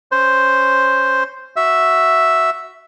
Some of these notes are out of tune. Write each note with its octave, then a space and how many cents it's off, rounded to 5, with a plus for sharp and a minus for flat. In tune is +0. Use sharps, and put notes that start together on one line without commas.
C#4 +0 C5 +0
F#4 +0 E5 +0